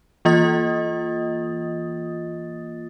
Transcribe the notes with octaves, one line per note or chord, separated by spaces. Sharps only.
E3 A#3 F4 D#5 D#6 A6